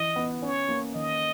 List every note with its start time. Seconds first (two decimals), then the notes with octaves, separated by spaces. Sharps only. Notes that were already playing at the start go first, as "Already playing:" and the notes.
Already playing: E3 E4 D#5
0.16 B3
0.42 C#4 C#5
0.69 A#3
0.95 D#3 D#5